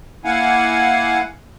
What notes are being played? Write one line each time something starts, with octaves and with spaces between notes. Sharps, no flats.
A#3 E4 F5 F#5 G#5